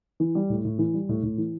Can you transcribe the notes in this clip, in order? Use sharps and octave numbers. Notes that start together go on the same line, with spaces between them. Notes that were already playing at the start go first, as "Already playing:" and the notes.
E3
G3
A2
A2
E3
G3
A2
A2
E3